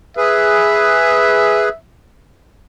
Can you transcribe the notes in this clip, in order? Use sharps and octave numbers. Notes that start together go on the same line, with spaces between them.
G#4 B4 E5